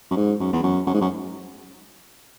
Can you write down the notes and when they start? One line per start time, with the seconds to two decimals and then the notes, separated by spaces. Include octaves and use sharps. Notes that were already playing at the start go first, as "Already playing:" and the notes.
0.11 F#2
0.16 G#2
0.40 F#2
0.53 E2
0.63 F#2
0.87 F#2
0.94 G#2
1.01 F#2